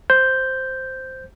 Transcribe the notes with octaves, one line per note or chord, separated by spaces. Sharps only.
C5 G6